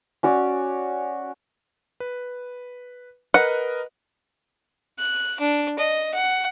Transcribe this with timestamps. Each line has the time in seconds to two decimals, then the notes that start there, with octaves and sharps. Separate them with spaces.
0.23 C#4 F#4 C#5 D5
2.00 B4
3.34 A#4 B4 D#5 F#5
4.99 F#6
5.40 D4
5.79 D#5
6.14 F#5